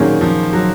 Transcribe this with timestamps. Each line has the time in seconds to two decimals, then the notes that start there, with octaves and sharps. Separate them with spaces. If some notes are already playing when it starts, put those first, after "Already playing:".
Already playing: A#2 D#3 F#3 A#3 C#4 G#4
0.21 F3
0.53 F#3